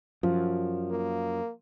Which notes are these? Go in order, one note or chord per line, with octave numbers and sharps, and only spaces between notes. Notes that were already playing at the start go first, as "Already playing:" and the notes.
F#2 F3
A#3